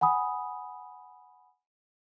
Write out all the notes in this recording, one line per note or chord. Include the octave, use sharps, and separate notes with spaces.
F#5 G#5 B5 D#6